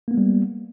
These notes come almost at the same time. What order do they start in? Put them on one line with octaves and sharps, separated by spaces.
A#3 B3 G#3 G3